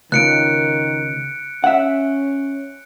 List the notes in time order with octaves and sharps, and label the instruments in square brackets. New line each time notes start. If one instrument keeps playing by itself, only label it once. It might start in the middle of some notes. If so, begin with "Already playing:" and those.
[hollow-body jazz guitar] C#2 [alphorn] D#3 [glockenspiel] F#6 C#7 D7
[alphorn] C#4 [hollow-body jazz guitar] E5 F#5